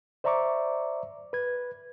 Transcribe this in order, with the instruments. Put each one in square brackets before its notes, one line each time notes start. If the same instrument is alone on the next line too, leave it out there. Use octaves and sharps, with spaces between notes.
[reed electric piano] C5 D5 E5 A#5 C#6 D6
B4 G#6